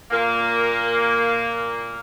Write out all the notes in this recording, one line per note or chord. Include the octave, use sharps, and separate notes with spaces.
A#2 A#3